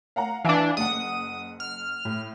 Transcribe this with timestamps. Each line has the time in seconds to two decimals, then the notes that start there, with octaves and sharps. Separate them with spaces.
0.16 F5 F#5 A#5
0.45 E3 D4 F5 G#5 D7
0.77 F#1 F#5 D#6
1.60 F6
2.05 A2